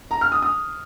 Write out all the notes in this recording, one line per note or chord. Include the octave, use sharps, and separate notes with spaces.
A#5
F6
D#6
D#6